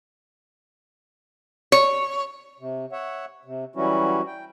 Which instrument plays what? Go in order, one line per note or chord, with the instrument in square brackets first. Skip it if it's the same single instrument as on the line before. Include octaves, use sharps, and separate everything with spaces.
[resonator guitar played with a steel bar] C#5
[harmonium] C3
C#5 E5 F#5
C3
E3 F#3 G3 C#4 E4 F#4
G5